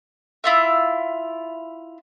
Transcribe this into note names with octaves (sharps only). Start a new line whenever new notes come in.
E4 F4 E5